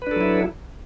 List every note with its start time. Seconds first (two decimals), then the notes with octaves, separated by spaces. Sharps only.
0.02 B4
0.07 D4
0.11 A4
0.16 F#3
0.21 E4